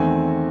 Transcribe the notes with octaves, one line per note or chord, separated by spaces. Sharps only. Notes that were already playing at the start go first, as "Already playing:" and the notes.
Already playing: E2 D#3 A3 C4 G#5